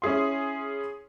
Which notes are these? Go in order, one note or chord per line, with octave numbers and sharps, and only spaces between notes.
C#4 E4 G#4 C6